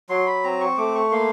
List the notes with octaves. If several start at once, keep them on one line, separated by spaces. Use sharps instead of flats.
F#3 C6
B5
C4 A#5
C#6
A3 D6
C#6
A#3 C6